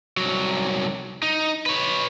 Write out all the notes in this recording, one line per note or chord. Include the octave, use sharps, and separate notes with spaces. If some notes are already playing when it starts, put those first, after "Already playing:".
C2 F#3
D#4
B4 C#5